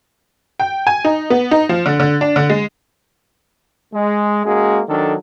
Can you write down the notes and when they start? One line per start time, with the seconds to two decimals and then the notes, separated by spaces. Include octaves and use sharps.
0.60 G5
0.87 G#5
1.05 D#4
1.30 B3
1.51 D#4
1.69 F3
1.86 D3
2.00 D3
2.21 D4
2.36 D3
2.50 G#3
3.94 G#3
4.45 G#3 A#3 C#4 F#4 G#4
4.88 D#3 F#3 D4 A4